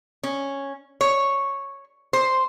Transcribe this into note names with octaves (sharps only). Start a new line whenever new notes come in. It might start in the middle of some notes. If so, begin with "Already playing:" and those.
C#4
C#5
C5